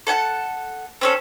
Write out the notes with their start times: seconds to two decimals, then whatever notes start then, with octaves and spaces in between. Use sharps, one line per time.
0.07 A4 F#5 G#5 A5
1.01 C4 C#4 A4